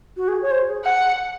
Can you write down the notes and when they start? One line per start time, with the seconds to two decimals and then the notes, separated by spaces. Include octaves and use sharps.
0.17 F#4
0.28 G#4
0.42 C#5
0.51 C5
0.68 G#4
0.85 F#5